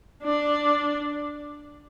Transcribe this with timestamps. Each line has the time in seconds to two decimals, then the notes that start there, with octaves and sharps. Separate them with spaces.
0.23 D4